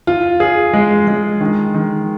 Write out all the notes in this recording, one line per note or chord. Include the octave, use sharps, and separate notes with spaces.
F4
G#4
G#3
G#3
D#3
D#3